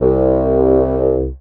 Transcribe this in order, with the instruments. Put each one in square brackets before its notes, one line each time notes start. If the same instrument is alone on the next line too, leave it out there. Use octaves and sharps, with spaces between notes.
[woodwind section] C2